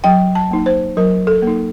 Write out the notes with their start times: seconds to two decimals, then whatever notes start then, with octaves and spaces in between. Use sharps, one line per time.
0.04 F#3 G5
0.35 A5
0.51 A#3 D#4
0.66 C5
0.97 F#3 A#4
1.27 A4
1.42 A#3 D#4